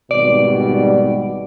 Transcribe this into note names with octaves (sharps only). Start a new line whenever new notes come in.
G#1 B2 G3 D5